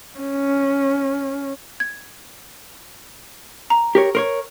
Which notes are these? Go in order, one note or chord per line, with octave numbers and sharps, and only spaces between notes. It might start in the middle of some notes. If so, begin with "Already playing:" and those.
C#4
G#6
A#5
G4 A#4 C#5
A#4 C5 C#5